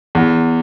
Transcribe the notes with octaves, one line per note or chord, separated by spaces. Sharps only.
E2